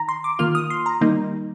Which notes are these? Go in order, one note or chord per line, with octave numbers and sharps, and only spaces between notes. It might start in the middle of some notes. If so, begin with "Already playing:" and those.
Already playing: D#3 A#5
C6
D6
D#3 A#3 F4 F6
D#6
C6
A#5
D#3 G3 A#3 D#4